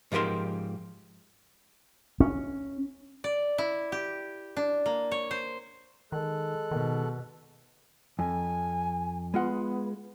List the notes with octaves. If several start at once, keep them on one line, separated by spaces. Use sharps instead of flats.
G#2 F3 G4 A#4 C6
C#4
D5
E4
G4
D4
A#3
C#5
C5
D#3 G#3 A4 F#6
B2 D#3
F2 G#5
G#3 B3 F4 F#5